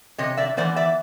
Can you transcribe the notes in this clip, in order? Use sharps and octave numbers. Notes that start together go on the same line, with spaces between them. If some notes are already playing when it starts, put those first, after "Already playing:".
C3 C#5 D#5
D5 E5
E3 G3 B3 C5 D5
D5 E5